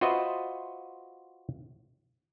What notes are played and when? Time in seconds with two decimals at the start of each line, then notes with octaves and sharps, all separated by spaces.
0.01 F4 F#4 B4 C5 D#5 E5